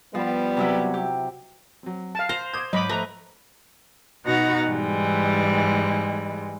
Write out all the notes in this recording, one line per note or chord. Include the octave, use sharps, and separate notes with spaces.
F3 G3 B3
C3 F#3 E4
G4
F#3 C4
F5 A5
C5 A#6 C7 F7
D6 D#6 G6 G#6
G#2 F#3 B4 D#5 B5 D6
F3 A3 B4 A#5 A#6
B2 D#4 F#4 F#5 A#5 A6
G#2 E3 G3 G#3